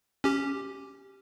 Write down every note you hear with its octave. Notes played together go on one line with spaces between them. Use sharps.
C#4 G4